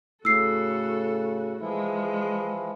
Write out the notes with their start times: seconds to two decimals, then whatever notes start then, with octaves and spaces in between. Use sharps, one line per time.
0.25 A2 C#3 F#4 A4 E6 C7
1.61 E3 F3 G#3 E4